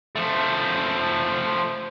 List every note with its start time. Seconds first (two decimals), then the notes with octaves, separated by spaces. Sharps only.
0.15 F3 A3